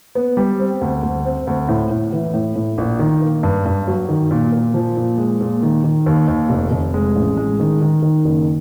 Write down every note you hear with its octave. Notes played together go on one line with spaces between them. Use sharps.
B3
G3
C4
D2
D2
C4
D2
A2
A2
E3
A2
A2
A#1
D#3
A#3
G2
G2
F#3
D#3
A#2
A#2
F3
A#2
G#3
A#2
D#3
D#3
D#2
D#2
F1
F1
G#3
A1
G#3
D#3
D#3
D#3
F#1